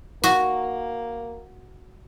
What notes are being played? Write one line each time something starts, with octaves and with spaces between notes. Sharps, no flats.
A#3 F#4